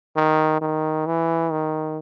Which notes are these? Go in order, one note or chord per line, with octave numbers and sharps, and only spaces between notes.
D#3
D#3
E3
D#3